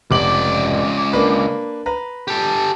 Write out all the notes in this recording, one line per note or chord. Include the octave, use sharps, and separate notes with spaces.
F1 C#2 D5 D6 F#7
A#3 D4 B4
B4 A#5
G4 A4